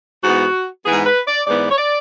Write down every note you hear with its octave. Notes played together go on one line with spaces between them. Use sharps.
G#2 E3 B3 F#4
G#2 E3 B3 G#4
B4
D5
G#2 E3 B3 D5
C#5
D5